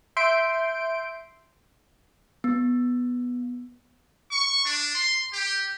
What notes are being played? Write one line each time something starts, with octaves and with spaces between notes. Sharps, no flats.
E5 C6 G6 D7
B3
C#6
D4
C6
G4